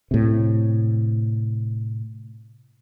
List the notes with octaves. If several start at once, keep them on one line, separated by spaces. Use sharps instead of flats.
A2 C3